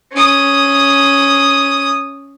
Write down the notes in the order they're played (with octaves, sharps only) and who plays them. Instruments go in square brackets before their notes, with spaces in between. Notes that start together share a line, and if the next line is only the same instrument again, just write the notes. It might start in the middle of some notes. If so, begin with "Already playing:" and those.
[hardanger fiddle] C#4 D#6